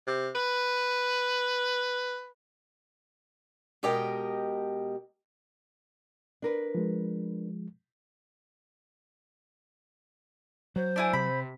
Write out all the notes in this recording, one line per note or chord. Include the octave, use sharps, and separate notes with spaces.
C3
B4
B2 G#3 G4 A#4 D#5 G5
D4 A#4 B4
F3 G#3
F#3 C5
D4 E4 G#5
C3 B5